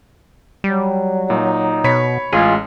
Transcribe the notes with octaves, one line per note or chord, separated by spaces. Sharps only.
F#3 G3
A#2 D#4
B2 C#5 B5 B6
A1 G#3 F4 G#4